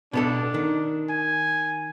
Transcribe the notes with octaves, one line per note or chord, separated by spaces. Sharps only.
B2 B3 D4 A4
D#3
G#5